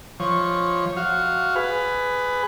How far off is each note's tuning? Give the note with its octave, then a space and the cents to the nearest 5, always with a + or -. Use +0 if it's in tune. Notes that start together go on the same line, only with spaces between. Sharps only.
F3 +0 C#5 -10 C#6 -5
F#4 +0 F5 +0
G#4 +0 B4 +15